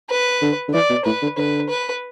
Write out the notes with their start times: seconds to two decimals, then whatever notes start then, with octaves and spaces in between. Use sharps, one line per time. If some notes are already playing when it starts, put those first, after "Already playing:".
0.10 B4
0.42 D3
0.68 D3
0.74 E3 D5
0.89 B2
1.05 A2 B4
1.22 D3
1.37 D3 B4
1.69 B4